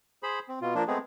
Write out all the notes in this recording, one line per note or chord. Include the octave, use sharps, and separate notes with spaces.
G#4 C5 B5
C4
B2 F4
F3 A#3 D4
G#3 A3 B3 C4 G#4